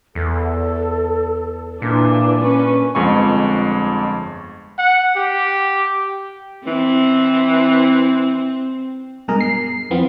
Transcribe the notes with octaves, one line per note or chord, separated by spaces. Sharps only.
E2 A4
A#2 E3 D4
C#4 B4 C#6
G1 F2 G#3 G#5 C#6
F#5
G4
E3 C4
G2 B2 G#3 G#4 A#4 A#5
C7
F2 E3 B3 C4 F4